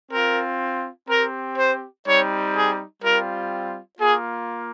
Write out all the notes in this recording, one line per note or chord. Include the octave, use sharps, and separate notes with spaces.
C4 F4 A#4
C4 G4 A#4
C5
G3 C4 D#4 C#5
G#4
G3 C4 F4 A#4
A#3 F4 G#4